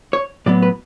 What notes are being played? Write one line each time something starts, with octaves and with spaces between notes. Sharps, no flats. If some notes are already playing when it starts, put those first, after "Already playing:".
C#5
A2 F#3 B3 D5
B4